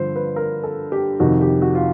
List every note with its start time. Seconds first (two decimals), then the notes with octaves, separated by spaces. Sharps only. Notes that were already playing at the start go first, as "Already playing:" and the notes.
Already playing: G2 D3 F3 C5
0.16 B4
0.36 A#4
0.63 A4
0.92 G4
1.20 F2 C3 D#3 F#4
1.41 G4
1.62 F#4
1.75 F4